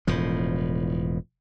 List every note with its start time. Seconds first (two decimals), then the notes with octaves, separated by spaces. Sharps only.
0.07 E1 A2 F3